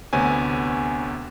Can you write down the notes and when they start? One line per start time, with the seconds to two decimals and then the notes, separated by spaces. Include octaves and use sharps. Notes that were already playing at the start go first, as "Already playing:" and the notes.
0.13 D2 C3 B3 C#5 G#5